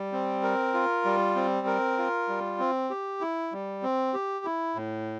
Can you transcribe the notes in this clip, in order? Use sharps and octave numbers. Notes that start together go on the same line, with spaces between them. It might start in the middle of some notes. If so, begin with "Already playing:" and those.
Already playing: G3
C4
A#4
F4
G3
C4
A#4
F4
G3
C4
G4
E4
G3
C4
G4
E4
A2